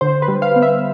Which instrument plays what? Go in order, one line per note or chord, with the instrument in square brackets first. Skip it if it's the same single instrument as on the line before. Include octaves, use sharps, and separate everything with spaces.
[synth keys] D3 C5
B4
G3
F5
B3
E5